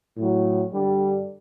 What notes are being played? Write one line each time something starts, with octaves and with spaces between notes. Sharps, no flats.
A2 F#3
G2 D3 G3